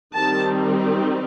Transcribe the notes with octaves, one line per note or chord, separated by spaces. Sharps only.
D#3 G3 C4 A5